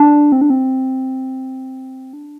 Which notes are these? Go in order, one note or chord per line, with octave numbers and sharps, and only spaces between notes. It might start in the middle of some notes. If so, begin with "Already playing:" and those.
Already playing: D4
C4
D4
C4
D4